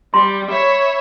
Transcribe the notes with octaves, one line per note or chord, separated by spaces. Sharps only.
G3 C6
C#5 E5 B5